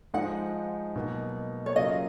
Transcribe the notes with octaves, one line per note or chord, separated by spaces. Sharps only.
G#2 F3 G#3 D#4 F#5
B2 F#3 A#3 D#4
C#5
C#3 F#3 A#3 F4 D#5